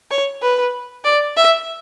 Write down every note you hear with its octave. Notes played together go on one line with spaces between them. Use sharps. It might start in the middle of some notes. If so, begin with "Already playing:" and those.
C#5
B4
D5
E5